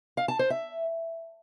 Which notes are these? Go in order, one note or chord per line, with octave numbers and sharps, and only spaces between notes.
F5
A5
C5
E5